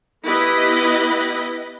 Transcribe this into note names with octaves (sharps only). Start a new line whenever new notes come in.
B3 E4 G4 B4 D#5 B5